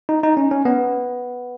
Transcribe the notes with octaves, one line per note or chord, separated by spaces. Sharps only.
D#4
D#4
C#4
C#4
B3